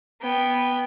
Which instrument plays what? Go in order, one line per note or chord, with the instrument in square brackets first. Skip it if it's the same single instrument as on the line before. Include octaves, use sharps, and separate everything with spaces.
[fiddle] B3 G5